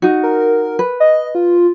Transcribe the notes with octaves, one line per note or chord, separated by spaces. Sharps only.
D#4 F#4
A#4
B4
D#5
F4